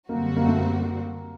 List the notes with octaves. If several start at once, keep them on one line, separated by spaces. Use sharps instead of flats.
F#2 D3 G3 A#3 C4 F#4
A#3
A3
A#3